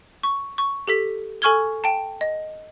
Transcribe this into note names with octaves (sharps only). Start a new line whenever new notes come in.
C#6
C#6
G4 A4 B6
A4 G#5 C#6 F6 G#6 G7
G5 A5
D#5